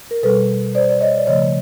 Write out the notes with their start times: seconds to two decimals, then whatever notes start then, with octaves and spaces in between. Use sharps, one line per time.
0.11 A#4
0.23 B2 G3 A4 B4
0.75 C5 D5
0.90 D5
1.01 C#5 D#5
1.18 D5
1.27 C#3 F3 A3 C#5 D#5